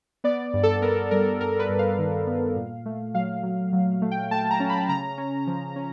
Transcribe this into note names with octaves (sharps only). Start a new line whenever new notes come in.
B3 D5
G2
A4
B3 A#4
G3 A#4
G2 A#4
B4
G2
F5
D#3
B3
A#2
A3
F#3 F5
F#3
F#3
A3
G5
A3 A5
A#5
C#4
B5
C#3 A#5
C#4
F3
C#4